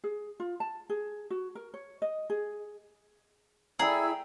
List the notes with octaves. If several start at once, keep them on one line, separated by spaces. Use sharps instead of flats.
G#4
F4
A5
G#4
F#4
A#4
C#5
D#5
G#4
E4 G#4 D5 G5 A#5 E6